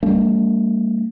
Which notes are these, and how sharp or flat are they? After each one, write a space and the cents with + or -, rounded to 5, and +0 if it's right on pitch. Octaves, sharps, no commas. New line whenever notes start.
G3 +10 A#3 -45 D4 -45